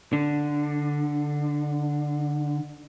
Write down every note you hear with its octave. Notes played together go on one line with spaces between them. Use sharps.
D3 D4